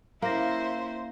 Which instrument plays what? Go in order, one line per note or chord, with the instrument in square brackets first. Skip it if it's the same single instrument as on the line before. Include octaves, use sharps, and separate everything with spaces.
[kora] A#3 [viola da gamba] C#4 E4 [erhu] C5 [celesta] F5 A#6